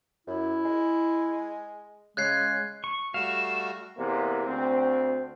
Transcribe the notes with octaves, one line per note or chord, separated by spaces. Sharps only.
F#2 E4
G#3
C#3 G#3 F#6 G#6 C7
C#6
G3 A3 F#4 F5 E7
E2 C3 A#3
D2 C4